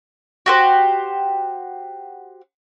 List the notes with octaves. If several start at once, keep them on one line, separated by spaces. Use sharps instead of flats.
F#4 G4 C5